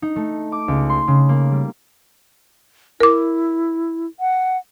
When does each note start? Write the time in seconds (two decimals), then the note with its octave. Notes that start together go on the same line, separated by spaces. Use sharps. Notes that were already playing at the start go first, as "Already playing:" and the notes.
0.02 D#4
0.16 A3
0.52 D6
0.68 C#2
0.90 C6
1.08 C#3
1.29 A#3
1.52 G3
3.00 E4 A#4 D6
4.20 F#5